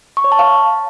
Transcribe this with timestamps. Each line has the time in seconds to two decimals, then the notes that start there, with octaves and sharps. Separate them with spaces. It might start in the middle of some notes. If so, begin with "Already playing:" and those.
0.17 C#6
0.24 C#5
0.32 A5
0.39 F5